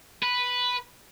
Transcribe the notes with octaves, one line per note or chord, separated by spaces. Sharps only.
B4